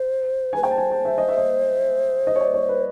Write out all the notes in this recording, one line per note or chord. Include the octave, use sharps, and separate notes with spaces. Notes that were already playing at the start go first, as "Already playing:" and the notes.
Already playing: C5
B4 G#5
C5 G5
A5
G#5
A5
E5
D#5
E5
D#5
D#5
C#5
D5
C#5
B4